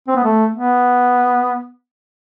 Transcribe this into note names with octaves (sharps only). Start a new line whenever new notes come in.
C4
B3
A3
B3